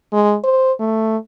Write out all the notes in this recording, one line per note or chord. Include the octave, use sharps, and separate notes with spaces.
G#3
C5
A3